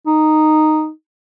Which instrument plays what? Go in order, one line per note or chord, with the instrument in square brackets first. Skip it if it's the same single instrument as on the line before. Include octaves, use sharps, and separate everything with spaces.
[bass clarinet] D#4